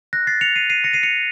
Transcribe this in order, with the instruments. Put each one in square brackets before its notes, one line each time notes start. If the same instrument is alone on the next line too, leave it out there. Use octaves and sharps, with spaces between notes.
[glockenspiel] F#6 A#6
A6 C7
C#7 F7
C7 D#7
C7 D#7
A#6 C#7
C7 D#7
C#7 F7